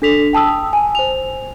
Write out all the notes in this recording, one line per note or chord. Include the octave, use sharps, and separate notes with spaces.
D4 A4 B6 F7
G5 A5 D#6 E6
G#5
C5 F7